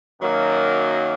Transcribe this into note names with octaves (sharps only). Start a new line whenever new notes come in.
F#2 D#3 F#3 A#3